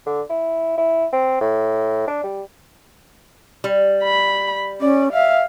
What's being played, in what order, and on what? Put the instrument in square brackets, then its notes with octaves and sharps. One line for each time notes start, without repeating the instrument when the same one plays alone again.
[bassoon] D3
E4
E4
C4
A2
D4
G3
[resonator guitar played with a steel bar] G3
[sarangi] B5
[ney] C#4 [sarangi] D5
[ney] E5 [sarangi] F5